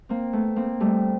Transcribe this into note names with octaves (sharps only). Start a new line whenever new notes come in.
A#3 C4
A3 B3
A#3 C4
G3 A3